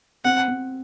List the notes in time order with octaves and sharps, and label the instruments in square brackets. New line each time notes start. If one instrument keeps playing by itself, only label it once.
[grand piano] C4 [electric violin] F#5
[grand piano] C4